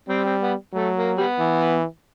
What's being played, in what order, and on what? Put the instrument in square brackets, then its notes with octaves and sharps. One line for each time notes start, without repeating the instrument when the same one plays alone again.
[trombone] G3 [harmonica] C4
[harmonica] C4
B3
[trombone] F#3 [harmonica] A3
[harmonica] A#3
G3 B3
[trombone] E3